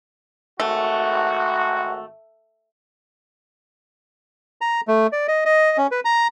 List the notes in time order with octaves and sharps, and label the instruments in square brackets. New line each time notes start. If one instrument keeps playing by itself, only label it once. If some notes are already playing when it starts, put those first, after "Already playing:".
[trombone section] G#1 F#4 [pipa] A3
[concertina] A#5
A3
D5
D#5
D#5
C#4
B4
A#5